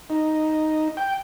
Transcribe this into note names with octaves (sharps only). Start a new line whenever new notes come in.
D#4
G5